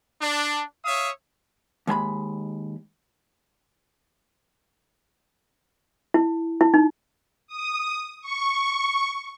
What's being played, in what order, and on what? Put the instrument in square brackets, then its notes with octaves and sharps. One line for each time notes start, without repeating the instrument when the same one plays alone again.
[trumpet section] D4
C#5 E5 F5 D#6
[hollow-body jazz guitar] D#2 G#3 G#5 B5
[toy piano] E4
E4
D#4
[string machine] D#6
C#6